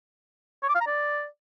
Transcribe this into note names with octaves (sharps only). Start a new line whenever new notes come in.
C#5
D6
F5
A#5
D5